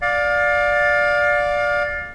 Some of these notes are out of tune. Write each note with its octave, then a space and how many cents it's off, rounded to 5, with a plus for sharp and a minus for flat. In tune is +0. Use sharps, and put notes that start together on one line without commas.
D5 +0 F5 +30